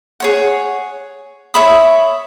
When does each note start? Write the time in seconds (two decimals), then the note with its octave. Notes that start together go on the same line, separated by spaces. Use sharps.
0.20 G#4 C#5 F#5
1.54 C#5 E5 B5 D#6